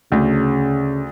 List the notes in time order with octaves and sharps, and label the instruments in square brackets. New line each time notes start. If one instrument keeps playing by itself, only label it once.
[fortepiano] D2 [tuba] C#3